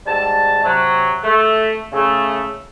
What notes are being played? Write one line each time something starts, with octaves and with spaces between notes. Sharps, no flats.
G#2 G3 A5
C3 F#3
A3
C#3 A3